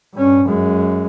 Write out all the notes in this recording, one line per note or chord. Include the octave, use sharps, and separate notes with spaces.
G2 C#4
F#2 G#3